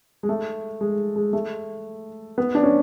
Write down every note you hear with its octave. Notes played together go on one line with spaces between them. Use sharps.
G#3
A3
G#3
G#3
A3
B3
D4
C#4